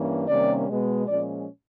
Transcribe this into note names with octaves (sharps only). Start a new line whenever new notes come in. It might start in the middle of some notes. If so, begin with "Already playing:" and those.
Already playing: G2 E3 A#3 C#4
C3 D#3 G3 A#3 C#4 D5
B2 G#3 B3
A#2 F3 G#3 C#4 D5